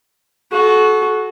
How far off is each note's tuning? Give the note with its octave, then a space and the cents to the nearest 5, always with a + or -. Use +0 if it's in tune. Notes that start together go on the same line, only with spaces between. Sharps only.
F#4 +0 A4 -35